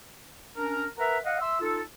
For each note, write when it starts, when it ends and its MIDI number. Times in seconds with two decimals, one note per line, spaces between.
0.57 0.85 61
0.57 0.85 62
0.57 0.85 70
0.98 1.18 70
0.98 1.18 71
0.98 1.18 76
0.98 1.18 78
0.98 1.18 82
1.25 1.39 75
1.25 1.39 77
1.25 1.39 78
1.40 1.58 76
1.40 1.58 84
1.40 1.58 88
1.61 1.81 63
1.61 1.81 65
1.61 1.81 69